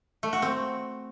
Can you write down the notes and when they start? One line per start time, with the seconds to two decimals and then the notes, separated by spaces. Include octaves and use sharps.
0.23 A3
0.33 F#4
0.42 C4